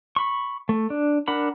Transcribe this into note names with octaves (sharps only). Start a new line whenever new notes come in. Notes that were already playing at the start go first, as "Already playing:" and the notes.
B5 C#6
A3
D4
D4 A#4 F#5 B5